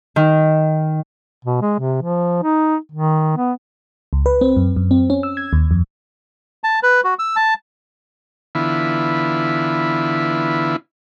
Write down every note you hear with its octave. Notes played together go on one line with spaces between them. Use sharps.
D#3
B2
G#3
C3
F3
D#4
D#3
B3
C#2
B4
C4
F#2
F#2
C4
C#4
E6
G#6
D#2
F2
A5
B4
F#4
E6
A5
D3 E3 B3 E4 F4